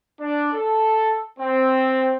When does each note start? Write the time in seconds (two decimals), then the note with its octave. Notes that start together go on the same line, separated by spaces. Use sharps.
0.20 D4
0.54 A4
1.40 C4